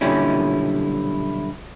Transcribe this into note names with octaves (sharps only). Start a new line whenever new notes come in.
B1 A#2 D3 G3 C#4 E4